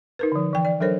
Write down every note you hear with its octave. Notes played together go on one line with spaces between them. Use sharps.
D#4 A#4 B4
D3 F3
E3 G5
D5
F#3 D4 A4 A#4 C5 C#5